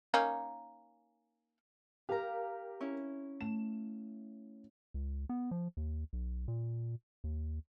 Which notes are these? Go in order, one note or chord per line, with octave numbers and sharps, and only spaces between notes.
A#3 C#4 D#4
G4 A#4 F5 A#5
C#4 E4
A3 E7
C#2
B3
F3
D#2
B1
A#2
D#2